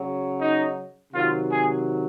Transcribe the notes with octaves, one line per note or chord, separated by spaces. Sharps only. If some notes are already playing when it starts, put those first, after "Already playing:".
Already playing: C#3 F#3
D#4
C3 D#3 F#3 F4
G#4